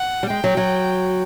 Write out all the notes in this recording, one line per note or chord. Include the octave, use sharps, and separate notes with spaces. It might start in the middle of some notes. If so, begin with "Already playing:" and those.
Already playing: F#5
G3
G#3 G5
F#3
F#3